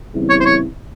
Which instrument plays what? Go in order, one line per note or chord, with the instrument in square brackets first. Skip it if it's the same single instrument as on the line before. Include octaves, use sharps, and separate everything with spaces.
[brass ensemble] E2 C#3 G3 C4 E4
[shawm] C#5
C5
C#5